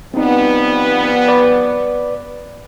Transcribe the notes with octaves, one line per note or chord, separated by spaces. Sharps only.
F3 G3 B3 C4 D#4
B4 D5